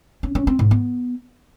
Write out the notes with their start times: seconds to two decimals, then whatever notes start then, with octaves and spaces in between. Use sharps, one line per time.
0.23 C#4
0.35 C#4
0.47 C4
0.59 G#2
0.71 B3